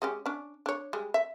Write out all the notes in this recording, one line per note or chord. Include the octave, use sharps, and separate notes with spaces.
G#3 C#4 G4
C#4 D4
D4 C#5
G3 G#3
E5